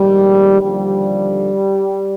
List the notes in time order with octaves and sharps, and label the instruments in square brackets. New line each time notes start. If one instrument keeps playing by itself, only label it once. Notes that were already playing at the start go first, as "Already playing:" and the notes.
Already playing: [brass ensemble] A#1 G#2 D#3 G3
D#2 D3 F3 G3